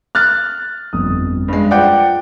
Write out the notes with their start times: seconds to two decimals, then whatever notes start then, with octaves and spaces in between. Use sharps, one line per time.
0.15 F6 F#6 A6
0.93 G1 F2 D#6
1.48 G2 G#3
1.71 F4 B4 C5 D5 F#5 G5